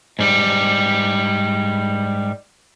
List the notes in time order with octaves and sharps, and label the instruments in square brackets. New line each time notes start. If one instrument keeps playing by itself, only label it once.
[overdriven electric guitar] G#2 G3